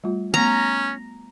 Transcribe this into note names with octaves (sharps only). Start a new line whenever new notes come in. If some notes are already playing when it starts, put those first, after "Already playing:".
G3 A3 F4
A3 B3 C#4 A#5